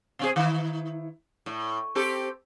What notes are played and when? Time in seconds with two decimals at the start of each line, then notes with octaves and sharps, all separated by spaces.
0.19 B2 C4 G#4
0.36 D#3 E4
1.46 A2
1.95 C4 G4 A4